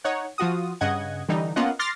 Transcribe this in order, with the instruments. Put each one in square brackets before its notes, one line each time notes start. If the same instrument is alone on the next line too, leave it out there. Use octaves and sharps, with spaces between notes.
[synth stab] D#4 C#5 F#5
F3 F4 F#4 D#6
G2 C#3 D#5 F#5 G#6
D3 E3 G3 D#4
A#3 B3 C#4 F4 D#5 F#5
C6 D6 F6 A6 A#6 C7